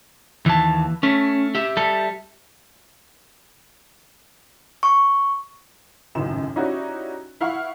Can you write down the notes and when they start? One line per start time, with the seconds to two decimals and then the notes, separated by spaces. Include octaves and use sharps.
0.46 D#2 E3 A5
1.03 A3 C#4
1.55 G4 E5
1.77 G3 A4
4.83 C#6
6.15 G#1 C#2 F#2 A2 E7
6.56 C#4 D#4 E4 F#4 G4 D5
7.41 E4 F5 F#5 C#6